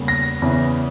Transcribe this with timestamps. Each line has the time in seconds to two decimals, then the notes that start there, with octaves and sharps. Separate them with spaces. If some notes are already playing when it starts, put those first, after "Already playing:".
Already playing: E2 C#3 G3 A#3
0.08 A#6
0.42 E2 C#3 E3